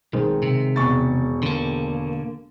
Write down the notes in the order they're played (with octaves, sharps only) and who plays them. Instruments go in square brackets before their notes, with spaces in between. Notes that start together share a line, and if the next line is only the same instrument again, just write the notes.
[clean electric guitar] B1 [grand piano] D#3 G#3 C4
[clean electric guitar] C3
[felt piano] E1 C#6 A6
[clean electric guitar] D3 A#3